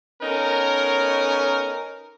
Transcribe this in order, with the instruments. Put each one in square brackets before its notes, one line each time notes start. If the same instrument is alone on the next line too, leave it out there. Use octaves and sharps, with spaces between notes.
[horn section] B3 C#4 D#4 A4 A#4